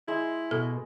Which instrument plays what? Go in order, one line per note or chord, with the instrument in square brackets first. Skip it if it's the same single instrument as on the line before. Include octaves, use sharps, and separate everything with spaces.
[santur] G#3 [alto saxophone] E4
[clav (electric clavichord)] B2 [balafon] A4